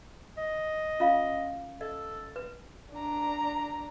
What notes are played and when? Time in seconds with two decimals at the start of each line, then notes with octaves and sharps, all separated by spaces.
0.38 D#5
1.00 C#4 F4 F5
1.81 A4 D#5
2.36 B4
2.92 D4 A#5